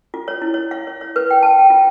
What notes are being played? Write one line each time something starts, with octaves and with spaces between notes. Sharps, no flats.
F4
C#5
E4
C#5
F5
C#5
C#5
B4
G5
A5
G5
F4